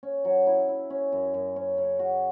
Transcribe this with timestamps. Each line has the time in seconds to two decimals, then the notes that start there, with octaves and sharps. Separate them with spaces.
0.03 C#4
0.25 F#3
0.47 E4
0.69 E4
0.90 C#4
1.12 F#2
1.34 F#2
1.56 C#4
1.78 C#3
1.99 F#4